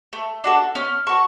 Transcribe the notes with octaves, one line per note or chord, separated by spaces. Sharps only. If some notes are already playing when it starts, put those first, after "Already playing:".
A3
D4 F#4 A4
C#4 F6
F#4 A4 C#6